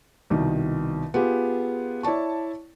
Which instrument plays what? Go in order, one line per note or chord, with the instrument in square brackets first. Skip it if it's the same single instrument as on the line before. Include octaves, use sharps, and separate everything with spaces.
[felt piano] C2 B2 D#3
B3 F4 G4 G#4
E4 C#5 D5 A5 C#6